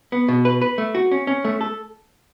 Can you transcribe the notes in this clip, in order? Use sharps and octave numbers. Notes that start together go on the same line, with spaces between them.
B3
B2
B4
B4
A3
F#4
C#4
C#4
A3
A4